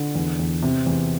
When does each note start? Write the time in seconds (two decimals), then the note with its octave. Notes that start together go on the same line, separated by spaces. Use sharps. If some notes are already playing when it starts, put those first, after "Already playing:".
Already playing: D3
0.15 E2
0.39 E2
0.62 C3
0.86 E2